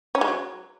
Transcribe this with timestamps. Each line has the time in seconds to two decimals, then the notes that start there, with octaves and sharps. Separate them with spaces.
0.15 C#4
0.21 G#3
0.28 F#3